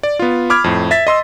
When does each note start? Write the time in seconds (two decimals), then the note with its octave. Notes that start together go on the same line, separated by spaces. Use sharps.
0.03 D5
0.19 B3 F4
0.50 B5 D6 F6 G#6
0.64 F2 A2
0.91 E5 A6 B6
1.07 D#5 C6 E6